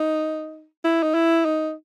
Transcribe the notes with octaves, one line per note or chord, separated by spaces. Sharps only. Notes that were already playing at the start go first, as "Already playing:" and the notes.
Already playing: D#4
E4
D#4
E4
D#4